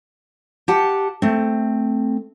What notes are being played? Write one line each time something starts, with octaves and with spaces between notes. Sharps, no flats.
G4 F#5 A5
A3 C4